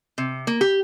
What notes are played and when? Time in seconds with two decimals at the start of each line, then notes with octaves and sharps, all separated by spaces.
0.18 C3
0.47 A#3
0.61 G4